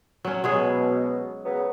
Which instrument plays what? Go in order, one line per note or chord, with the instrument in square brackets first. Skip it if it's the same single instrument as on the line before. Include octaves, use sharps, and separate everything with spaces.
[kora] F#3 C#4
[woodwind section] B2 [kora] F#3 G#3 G#4
[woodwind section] C#3 F#3 B3